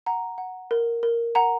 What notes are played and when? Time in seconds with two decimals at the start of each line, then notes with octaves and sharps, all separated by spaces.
0.06 F#5 A#5
0.38 F#5
0.71 A#4
1.03 A#4
1.35 F#5 A#5